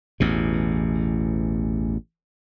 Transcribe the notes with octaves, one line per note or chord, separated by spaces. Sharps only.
A1 E2 B2